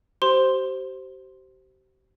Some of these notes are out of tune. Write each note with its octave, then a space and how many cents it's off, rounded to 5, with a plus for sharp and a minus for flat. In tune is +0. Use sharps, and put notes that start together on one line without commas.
G4 -40 C5 +0 C6 +0